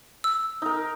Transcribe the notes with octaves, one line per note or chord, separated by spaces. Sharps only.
E6
D#4 A#4